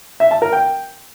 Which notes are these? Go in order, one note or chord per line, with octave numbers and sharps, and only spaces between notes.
E5
A5
A#4
G5